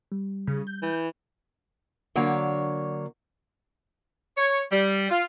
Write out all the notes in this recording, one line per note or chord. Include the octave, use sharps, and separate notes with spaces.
G3
C#3
G6
E3
D3 F#3 A#3 D4 C#5
C#5
G3
F4